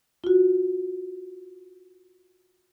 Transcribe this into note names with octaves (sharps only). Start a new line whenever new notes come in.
F4 F#4